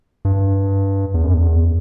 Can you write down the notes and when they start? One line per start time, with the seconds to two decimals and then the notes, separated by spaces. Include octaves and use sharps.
0.25 G2
1.14 E2
1.24 F#2
1.33 E2